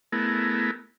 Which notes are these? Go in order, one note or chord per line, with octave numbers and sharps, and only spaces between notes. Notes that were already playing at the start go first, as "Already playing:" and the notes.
A3 B3 E4 G#4 A#4